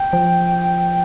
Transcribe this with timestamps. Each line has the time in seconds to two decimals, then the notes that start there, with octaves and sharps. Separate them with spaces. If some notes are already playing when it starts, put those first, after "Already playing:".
Already playing: G5
0.13 F3